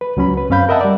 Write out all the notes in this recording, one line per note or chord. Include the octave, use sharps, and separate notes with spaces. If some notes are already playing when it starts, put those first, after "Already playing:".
B4
C#2 F#3 C#4 B5
B4
F#2 C4 C#4 F5 B5 G6
A#4 D#5 E5 F#5 A5 B5
G3 D5